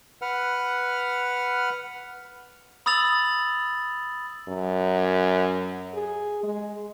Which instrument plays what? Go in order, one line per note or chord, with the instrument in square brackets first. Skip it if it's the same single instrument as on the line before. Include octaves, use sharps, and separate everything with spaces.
[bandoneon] B4 F#5 F6
[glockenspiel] B5 D#6 E6 A6 F7 F#7
[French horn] F#2
G#4
G#3